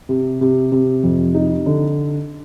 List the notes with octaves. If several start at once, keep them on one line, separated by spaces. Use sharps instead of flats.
C3
C3
C3
F2
D#4
D3